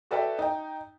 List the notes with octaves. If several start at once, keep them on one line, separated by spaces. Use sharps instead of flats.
F#4 A4 B4 D5 E5 G5
D#4 G5